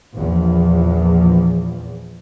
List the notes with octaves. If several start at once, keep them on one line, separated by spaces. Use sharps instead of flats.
A#1 E2 F3